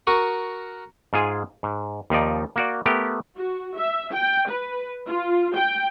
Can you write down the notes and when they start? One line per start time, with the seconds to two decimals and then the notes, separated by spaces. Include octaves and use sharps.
0.07 F#4 A#4 C#6 D#6
1.13 G#2 F4 G#4 G#5
1.63 G#2
2.10 D#2 F3 D#4 D5
2.56 A#3 F#4 D5
2.86 A3 B3 G4 A#4 G5
3.36 F#4
3.77 E5
4.13 G5
4.49 B4
5.07 F4
5.55 G5